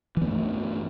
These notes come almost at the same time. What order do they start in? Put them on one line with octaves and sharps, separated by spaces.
E3 B3 A3 G2